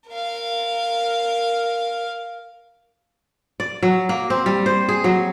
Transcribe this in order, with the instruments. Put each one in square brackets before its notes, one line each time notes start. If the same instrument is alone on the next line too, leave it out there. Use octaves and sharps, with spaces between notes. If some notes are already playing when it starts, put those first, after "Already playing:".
[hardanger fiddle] A#4 F5
[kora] D5
F#3
A#3
C4
G3
C5
G#4
F#3